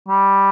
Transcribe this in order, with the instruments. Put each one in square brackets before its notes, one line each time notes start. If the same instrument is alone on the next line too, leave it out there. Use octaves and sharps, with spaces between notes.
[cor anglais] G3